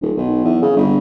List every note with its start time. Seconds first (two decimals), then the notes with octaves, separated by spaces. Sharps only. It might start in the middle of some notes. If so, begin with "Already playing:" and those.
0.01 D#1
0.17 B1
0.44 E2
0.62 C#3
0.76 G1